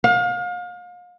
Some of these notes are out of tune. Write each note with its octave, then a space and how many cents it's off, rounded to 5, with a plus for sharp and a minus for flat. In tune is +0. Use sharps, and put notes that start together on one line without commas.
F5 +35